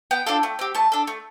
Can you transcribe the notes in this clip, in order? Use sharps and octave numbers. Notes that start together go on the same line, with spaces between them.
B3 G5
D4 F4 A4
A3
C4 G4
A3 A5
D4 A4
A3